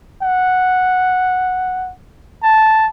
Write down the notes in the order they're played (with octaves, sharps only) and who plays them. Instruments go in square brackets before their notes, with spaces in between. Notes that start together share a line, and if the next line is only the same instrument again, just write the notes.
[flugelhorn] F#5
A5